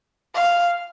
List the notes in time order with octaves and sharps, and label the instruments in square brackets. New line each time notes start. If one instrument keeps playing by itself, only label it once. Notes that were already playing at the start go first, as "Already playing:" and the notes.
[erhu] F5